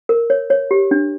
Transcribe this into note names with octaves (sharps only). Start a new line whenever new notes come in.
A#4
C#5
C#5
G4
D4